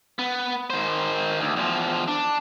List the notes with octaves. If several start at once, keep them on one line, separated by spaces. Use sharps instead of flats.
B3
D#3 C5
D2
E2 F3
D4